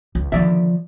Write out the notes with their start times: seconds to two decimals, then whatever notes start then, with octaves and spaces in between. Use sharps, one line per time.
0.15 C#2
0.32 D3 D#3 F3 D5 E5